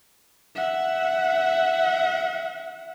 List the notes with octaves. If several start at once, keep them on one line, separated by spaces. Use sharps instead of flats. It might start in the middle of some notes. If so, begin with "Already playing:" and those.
E5 F#5